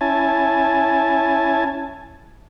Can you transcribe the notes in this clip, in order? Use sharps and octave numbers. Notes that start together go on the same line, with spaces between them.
C#4 E4 G#5 A5